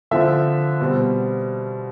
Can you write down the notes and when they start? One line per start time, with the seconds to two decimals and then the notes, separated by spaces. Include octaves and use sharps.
0.11 D3 F3 C4 E5
0.81 B2 G3 C4